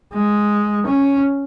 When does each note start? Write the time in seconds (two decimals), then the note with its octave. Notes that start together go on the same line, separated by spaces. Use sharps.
0.13 G#3
0.86 C#4